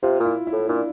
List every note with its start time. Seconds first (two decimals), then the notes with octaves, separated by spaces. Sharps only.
0.02 C3 F4
0.20 A#2
0.25 E4
0.47 E4
0.53 A2
0.69 A#2 D4